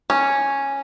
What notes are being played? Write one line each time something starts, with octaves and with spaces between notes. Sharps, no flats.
C#4